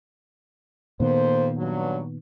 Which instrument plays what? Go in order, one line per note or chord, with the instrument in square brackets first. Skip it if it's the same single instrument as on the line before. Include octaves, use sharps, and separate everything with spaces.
[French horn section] F2 A#3 C5 [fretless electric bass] A#2 D#3 B3
[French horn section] G2 F#3